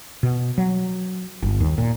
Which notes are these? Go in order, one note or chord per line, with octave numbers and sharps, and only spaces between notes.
B2
F#3
G1
D#2
A#2